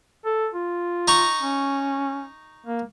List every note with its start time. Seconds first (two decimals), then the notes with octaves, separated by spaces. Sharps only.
0.25 A4
0.54 F4
1.08 D#4 A#5 C#6
1.42 C#4
2.67 A#3